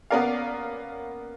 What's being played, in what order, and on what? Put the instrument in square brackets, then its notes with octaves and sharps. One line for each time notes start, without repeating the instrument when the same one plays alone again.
[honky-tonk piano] A#3 B3 C#4 A#4 D5 F5